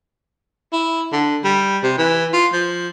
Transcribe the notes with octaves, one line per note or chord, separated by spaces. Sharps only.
E4
D3
G3
C3
E3
F4
F3